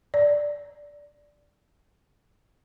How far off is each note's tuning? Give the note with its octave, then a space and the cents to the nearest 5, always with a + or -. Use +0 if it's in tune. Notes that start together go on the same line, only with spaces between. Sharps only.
D5 +0